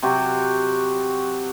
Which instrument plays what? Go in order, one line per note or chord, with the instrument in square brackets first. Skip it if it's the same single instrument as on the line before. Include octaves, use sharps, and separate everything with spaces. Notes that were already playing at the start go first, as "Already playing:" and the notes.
[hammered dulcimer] C3 F#3 F#4 G4